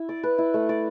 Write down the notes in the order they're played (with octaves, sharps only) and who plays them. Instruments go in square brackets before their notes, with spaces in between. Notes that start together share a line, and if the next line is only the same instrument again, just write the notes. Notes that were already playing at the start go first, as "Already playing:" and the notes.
Already playing: [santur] E4
D5
B4
E4
A3
D5